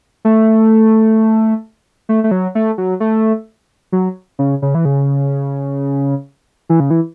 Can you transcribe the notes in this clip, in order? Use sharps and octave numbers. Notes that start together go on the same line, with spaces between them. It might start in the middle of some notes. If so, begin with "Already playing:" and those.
A3
A3
A3
F#3
A3
F#3
A3
F#3
C#3
C#3
E3
C#3
E3
C#3
E3